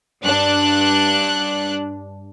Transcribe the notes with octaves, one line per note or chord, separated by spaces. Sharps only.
G2 D4 F#6